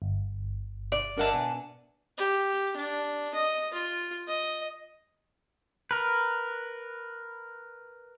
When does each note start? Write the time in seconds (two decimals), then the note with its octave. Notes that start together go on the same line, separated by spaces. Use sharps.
0.02 G1
0.92 D5
1.17 D4 A#4 D#5 E5 F#5 A5
1.33 B2 G#5
2.18 G4
2.76 D4
3.34 D#5
3.73 F4
4.27 D#5
5.91 A#4 B4